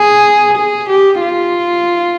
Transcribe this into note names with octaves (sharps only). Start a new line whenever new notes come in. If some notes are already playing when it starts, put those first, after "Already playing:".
Already playing: G#4
G#4
G4
F4